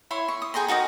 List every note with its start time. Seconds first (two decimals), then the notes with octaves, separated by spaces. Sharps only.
0.11 E4 C#5 C6
0.28 C#6
0.42 D#6
0.54 G#4 G5 A#5 C6
0.68 D#4 F#4 A#4 D#5